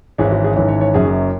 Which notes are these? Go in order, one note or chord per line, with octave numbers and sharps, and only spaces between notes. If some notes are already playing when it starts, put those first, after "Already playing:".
G#1 G#2 E3 C#4 G#4
F#4
G#4
G#1 G#2 E3 C#4 C#5
C#5
C#5
F#1 F#2 F#3 G#4